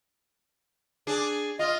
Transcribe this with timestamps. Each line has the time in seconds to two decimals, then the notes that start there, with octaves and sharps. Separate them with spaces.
1.07 D4 G#4
1.59 F4 D#5